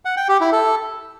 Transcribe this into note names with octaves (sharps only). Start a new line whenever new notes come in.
F#5
G5
G4
E4
A4